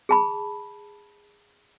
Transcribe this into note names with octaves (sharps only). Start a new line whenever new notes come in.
G#4 A5 B5